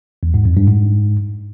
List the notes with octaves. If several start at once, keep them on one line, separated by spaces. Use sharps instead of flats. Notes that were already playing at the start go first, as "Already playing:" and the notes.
E2
G#2
F2
G2
G#2